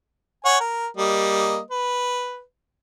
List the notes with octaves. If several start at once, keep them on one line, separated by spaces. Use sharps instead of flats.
C#5 F#5 G#5
A#4
G3 A#3 D#5
B4